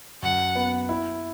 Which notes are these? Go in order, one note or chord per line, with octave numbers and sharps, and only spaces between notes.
F#2 F#5
B3
E4